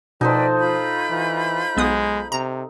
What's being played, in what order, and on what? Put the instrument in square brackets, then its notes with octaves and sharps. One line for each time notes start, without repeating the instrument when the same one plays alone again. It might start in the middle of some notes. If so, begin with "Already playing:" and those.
[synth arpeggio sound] B2 [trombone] F3 [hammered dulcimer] D#4 A4 C5 [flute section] B4 D5 G5
[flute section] F4 B5 G6
[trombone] E3
[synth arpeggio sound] B1 B3 D#6 [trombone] G#3
[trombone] C3 [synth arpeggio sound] A#5